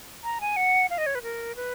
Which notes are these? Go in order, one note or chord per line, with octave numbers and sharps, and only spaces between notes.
A#5
G#5
F#5
F5
D#5
C#5
B4
A#4
B4